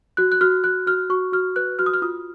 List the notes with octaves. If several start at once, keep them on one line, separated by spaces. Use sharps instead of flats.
F#4 F#6
F#6
F#4 F6
F#4 F#6
F#4 F6
F#4 C#6
F#4 F6
B4 F#6
F#4 F6
D#6
F6
F4 D#6